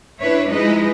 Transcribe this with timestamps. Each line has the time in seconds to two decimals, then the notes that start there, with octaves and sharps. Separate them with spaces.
0.18 D4 E4 B4 C#5 E5
0.48 F3 G#3 D#4 E4 B4 D#5